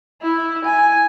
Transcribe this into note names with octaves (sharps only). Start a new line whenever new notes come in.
E4
G#5